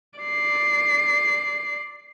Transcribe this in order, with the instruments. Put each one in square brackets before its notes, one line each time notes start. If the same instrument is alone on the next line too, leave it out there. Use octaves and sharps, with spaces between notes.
[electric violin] D5 C7